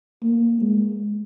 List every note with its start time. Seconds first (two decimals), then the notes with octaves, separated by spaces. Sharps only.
0.23 A#3
0.62 G#3